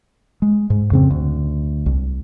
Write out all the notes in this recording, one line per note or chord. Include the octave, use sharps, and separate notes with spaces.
G#3
G#2
F2 C#3 C4
D2
C2